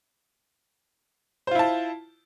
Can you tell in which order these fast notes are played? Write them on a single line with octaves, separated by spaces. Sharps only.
C5 F4 E4 A5